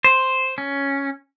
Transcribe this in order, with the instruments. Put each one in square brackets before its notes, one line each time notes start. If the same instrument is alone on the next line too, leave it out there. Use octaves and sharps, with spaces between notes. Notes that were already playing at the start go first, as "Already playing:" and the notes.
[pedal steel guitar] C5
C#4